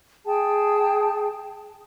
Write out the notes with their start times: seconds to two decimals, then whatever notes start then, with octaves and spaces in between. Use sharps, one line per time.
0.24 G#4 G5 A5